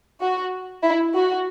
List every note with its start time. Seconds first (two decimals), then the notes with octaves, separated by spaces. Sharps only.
0.22 F#4
0.83 E4
1.15 F#4